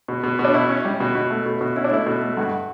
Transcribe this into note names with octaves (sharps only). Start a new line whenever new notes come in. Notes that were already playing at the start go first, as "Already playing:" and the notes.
B2
B2
B2
D4
B2 E4
C#4
G3
B2
B2
A3
B2
B2
C#4 E4
D4
A3 E4
B2
A3
G2 F#4